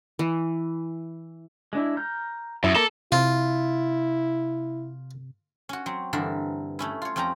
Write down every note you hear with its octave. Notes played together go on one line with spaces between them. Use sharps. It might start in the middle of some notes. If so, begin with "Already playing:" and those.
E3
G#3 D4 E4
A#5 F6 G6
F#2 E4 E5 C6 D#6
A#3 A4
C3 E4 F4
C#4 F#4
F#3 C4
G2 D3 E3 A#4 E5
A3 C#4 E4
F4 C#5
F2 C4 C#4 G4 A#5